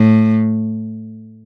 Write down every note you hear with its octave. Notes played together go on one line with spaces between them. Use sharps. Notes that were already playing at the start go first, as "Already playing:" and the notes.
Already playing: A2